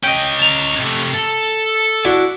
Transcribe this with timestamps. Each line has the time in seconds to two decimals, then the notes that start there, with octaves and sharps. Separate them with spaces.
0.04 C#4 D#5 G5
0.39 A5 A#5
0.79 C3 A3
1.14 A4
2.05 D4 E4 F#4